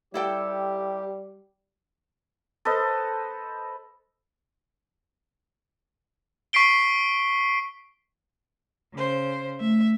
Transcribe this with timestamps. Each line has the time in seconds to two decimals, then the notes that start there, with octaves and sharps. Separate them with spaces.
0.14 G3 E4 G4 A4 G5
2.65 A4 B4 C5 D#5
6.53 C#6 B6 C7 D7 G7
8.93 C#3 C5
9.61 A3 E5